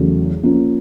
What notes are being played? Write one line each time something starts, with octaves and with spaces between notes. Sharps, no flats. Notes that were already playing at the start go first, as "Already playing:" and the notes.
Already playing: E2 C#3 F#3 A3
F3 A#3 C#4